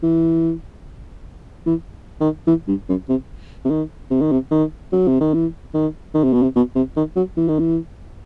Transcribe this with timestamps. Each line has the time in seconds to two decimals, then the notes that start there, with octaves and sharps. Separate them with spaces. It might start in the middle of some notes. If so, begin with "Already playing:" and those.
0.03 E3
1.66 E3
2.21 D#3
2.48 E3
2.68 G2
2.89 F#2
3.09 C3
3.65 C3
3.70 D#3
4.11 C3
4.21 D#3
4.32 C3
4.51 D#3
4.93 F#3
5.08 C3
5.20 D#3
5.34 E3
5.74 D#3
6.14 D#3
6.24 C3
6.33 B2
6.42 C3
6.56 B2
6.76 C3
6.97 D#3
7.16 F#3
7.37 E3
7.48 D#3
7.59 E3